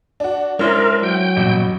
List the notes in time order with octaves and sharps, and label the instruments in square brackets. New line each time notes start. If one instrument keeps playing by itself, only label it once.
[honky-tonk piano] D4 F#4
[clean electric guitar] G#3 D4 C5 [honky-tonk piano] C#4 E4 D5 [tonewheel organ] A#4
[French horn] F#3 [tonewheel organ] G5
[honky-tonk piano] A1 [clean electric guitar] E2 G2 A#2